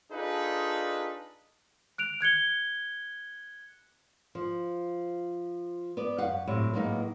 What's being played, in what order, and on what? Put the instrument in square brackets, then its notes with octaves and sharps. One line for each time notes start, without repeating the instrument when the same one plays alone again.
[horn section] D4 D#4 F4 G#4 A4 B4
[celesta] F#6 D7 F7
F#6 G#6 C#7 G7
[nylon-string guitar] F3
B3 B4 D5
F#2 F5 F#5
A2 C3 F#3
A2 F#3 G#3 A#3 B3 D#4